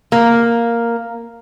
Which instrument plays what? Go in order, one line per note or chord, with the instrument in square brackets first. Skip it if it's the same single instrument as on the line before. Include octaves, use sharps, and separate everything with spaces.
[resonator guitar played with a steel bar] A#3